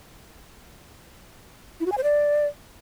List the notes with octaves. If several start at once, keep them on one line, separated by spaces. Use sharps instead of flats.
E4
F#4
G#5
C5
D5